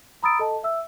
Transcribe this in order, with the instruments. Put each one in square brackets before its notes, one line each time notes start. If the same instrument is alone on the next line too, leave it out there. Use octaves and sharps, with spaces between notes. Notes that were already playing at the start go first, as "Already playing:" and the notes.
[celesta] A#5 B5 D#6 E6 A6 D7
A4 D#5 A5
E5 E6